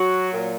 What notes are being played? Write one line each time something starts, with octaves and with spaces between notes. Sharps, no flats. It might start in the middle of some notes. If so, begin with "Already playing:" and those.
Already playing: F#3 F#4
A#2